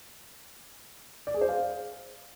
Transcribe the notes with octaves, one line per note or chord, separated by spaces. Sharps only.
D5
G#4
C5
F5